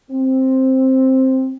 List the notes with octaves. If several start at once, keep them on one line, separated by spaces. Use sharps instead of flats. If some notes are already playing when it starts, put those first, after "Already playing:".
C4